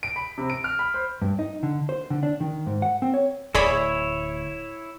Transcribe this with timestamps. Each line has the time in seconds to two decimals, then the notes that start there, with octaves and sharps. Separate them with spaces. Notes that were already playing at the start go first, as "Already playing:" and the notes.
0.03 D7
0.16 B5
0.38 C3
0.50 D7
0.64 F6
0.79 B5
0.94 C5
1.22 G2
1.39 D#4
1.63 D3
1.89 C5
2.10 D3
2.23 D4
2.40 D#3
2.66 G#2
2.82 F#5
3.02 C4
3.14 C#5
3.55 D1 E4 G#4 C#5 D5 B5